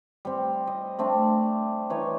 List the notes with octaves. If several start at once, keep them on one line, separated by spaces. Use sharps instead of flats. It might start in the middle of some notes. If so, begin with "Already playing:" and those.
G3 C4
D#5
A3 C4 D4
E3 D#4 C#5